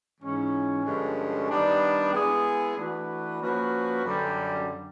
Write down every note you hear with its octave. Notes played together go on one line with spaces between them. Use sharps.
G#2 E3 G#3 C#4
G2 D3 F3 G#3 C#4
D#3 G3 B3 D4
G#3 B3 E4 G#4
E3 A3 D4 F#4 B4
F3 A#3 C#4 F#4 B4
F#2 D3 G3